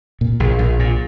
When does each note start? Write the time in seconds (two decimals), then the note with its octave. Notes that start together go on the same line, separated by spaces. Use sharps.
0.21 A#2
0.40 A#1
0.59 A#1
0.79 A#2